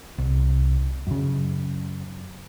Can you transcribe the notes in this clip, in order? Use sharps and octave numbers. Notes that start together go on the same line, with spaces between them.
C2
F#2 C#3